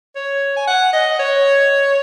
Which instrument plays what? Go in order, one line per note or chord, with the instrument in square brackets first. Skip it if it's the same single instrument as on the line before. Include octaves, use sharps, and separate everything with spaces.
[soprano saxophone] C#5
G#5
F#5
D#5
C#5